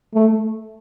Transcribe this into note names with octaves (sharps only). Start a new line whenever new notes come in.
A3